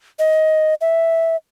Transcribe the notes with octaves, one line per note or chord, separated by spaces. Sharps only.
D#5
E5